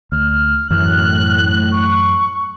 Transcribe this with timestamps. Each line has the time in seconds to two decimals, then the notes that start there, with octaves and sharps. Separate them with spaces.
0.12 D2 F6
0.71 F#2 A2 E3 F#3 F6 F#6
1.72 C#6